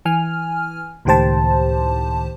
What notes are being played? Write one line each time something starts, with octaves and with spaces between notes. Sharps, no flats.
E3 G#5 F6
C#2 A2 D#3 G4 C5 A5